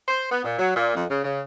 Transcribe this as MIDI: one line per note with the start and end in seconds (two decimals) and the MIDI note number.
0.08 0.31 72
0.31 0.42 59
0.45 0.58 46
0.59 0.71 54
0.76 0.95 46
0.95 1.04 41
1.10 1.24 49
1.24 1.41 49